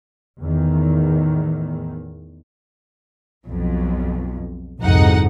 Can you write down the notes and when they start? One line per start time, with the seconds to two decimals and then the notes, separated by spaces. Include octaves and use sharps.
0.40 E2 A2 D#3
3.44 B1 F2
4.80 G1 C2 F2 G#2 D#4 F#5